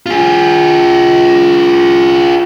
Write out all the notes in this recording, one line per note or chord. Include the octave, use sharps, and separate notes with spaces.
F4 G#4